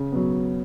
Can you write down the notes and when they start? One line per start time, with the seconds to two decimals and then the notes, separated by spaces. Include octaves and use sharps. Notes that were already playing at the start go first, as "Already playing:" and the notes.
Already playing: C#3
0.12 F#3 B3